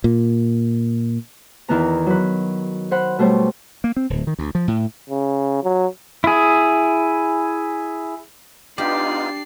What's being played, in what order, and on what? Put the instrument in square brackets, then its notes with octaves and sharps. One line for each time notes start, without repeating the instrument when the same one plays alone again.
[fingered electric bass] A#2
[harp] E2 D#3 E3 B3 A#5
F#3 B4
C5 F#5 B5
B2 G3 A3 C5 C#5
[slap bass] A#3
C4
D1
D#3
D2
F3
A2
[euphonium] C#3
F#3
[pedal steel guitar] E4 G#4
[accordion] B3 D#4 F4 [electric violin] D4 C7 [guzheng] G4 [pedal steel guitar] D5